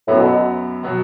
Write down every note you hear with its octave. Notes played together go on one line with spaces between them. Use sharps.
F#2 A2 F#3 B3
B2
B2 F#3 B3